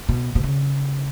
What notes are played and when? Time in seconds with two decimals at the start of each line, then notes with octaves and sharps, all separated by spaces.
0.09 B2
0.35 B2
0.44 C#3